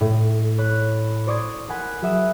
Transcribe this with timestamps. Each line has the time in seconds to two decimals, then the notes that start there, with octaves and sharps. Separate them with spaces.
0.01 A2
0.58 C#5 B5 F#6
1.27 C5 D5 C#6 D#6 G#6 A6
1.69 A#4 F#5 G#5 B5
2.02 F#3 G#4 E5 F#5 D#6 E7